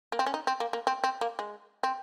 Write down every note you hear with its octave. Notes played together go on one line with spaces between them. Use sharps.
A#3
C4
C#4
D#4
C4
A#3
A#3
C4
C4
A#3
G#3
C4